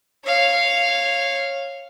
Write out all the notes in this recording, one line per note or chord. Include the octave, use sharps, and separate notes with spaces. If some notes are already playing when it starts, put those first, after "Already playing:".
C#5 F5